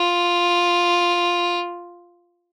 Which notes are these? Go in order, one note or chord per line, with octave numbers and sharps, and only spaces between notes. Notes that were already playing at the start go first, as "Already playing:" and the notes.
Already playing: F4